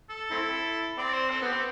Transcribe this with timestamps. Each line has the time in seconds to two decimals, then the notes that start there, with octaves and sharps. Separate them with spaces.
0.10 A4
0.31 A3 C4 E4
0.98 C4 D5
1.13 C5
1.30 C4 A4
1.42 B3 G4
1.52 C4